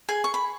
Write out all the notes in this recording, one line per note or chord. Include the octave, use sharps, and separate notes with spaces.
G#4 G#5
C#6
B5